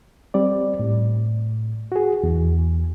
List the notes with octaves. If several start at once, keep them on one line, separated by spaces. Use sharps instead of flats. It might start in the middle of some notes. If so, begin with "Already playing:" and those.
G3 C4 D5
A2
F#4 G#4
E2